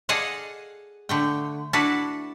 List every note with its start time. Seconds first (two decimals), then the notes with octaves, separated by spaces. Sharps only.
0.09 G#4 A4 D5 D#5 F5 F#5
1.09 D3 A3 G5
1.73 D4 E4 F#4 A4 B4 D5